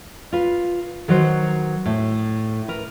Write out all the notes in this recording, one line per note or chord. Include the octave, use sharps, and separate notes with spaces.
F4 B4
D#3 F#3 B4 C5
A2
A#4 B4